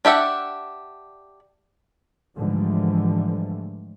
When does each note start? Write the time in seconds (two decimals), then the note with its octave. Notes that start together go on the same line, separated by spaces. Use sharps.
0.05 D4 G4 E5 F#5
2.36 G#2 D3 E3 F3 G3 A3